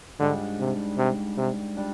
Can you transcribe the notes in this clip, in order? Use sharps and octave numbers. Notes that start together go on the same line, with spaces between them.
G#2 D3 G3 D4
C3
C3
C3
G3 D4